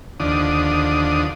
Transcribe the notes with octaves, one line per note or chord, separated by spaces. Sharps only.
D#2 D3 F3 D4 D#6